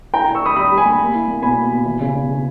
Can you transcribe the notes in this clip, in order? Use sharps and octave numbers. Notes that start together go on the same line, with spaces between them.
E4 G5 A#5
E4 G5 A#5
C#6 E6
E4 B5 D#6
G3 B5 D#6
G3
G#5 B5
A#3
A#3
E4
A#3
B2 G#5 B5
A#3
B2
E3
C#3
C#3
C#3